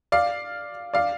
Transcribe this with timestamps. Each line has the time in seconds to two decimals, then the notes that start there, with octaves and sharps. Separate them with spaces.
0.12 D5 F5
0.94 D5 F5